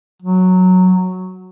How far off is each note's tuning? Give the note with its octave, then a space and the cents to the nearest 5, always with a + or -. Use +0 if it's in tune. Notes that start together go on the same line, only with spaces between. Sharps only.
F#3 -5